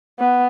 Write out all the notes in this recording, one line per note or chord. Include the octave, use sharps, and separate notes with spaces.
B3